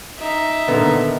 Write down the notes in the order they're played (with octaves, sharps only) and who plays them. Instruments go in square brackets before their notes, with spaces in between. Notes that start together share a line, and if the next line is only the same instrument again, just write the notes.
[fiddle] D#4 E5
[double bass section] A#2 D#3 [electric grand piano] D3 [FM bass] B3